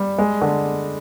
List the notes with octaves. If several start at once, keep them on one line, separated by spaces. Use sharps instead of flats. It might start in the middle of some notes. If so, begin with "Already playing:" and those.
Already playing: G3
G#3
D3